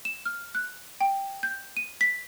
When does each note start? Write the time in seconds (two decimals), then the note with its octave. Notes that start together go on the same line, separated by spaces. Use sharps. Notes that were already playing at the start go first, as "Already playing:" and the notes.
0.05 E7
0.26 F6
0.55 F#6
1.01 G5
1.43 G6
1.77 D#7
2.01 B6